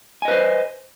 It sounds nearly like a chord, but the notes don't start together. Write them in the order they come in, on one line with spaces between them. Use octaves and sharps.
G#5 D#5 B4 C5